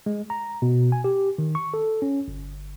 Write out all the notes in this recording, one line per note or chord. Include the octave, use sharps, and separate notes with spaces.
G#3
A#5
B2
G#5
G4
D#3
C#6
A4
C#4
G1